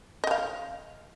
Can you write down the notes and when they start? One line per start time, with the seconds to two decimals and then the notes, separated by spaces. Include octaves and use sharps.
0.24 D#5
0.27 G5
0.31 F5